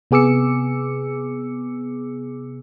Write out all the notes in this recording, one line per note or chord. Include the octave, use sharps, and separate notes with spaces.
C3 B3 G#4 D6 E6 C#7